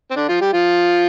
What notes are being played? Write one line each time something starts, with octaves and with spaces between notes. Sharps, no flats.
C4
D3 D4
F3 F4
G3 G4
F3 F4